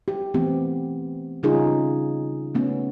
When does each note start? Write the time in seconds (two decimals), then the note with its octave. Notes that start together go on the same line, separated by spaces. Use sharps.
0.08 G4
0.34 E3 A3 B3 C4 G4
1.43 C#3 G3 C#4 D#4 F4 G#4
2.55 A3 B3 C#4